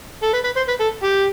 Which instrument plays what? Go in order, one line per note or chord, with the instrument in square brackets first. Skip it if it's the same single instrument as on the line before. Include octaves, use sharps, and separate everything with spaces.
[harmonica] A4
B4
B4
C5
B4
A4
G4